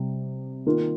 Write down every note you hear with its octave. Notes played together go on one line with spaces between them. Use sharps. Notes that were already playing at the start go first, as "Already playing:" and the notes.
Already playing: C3 G3
D#3 A#3 F4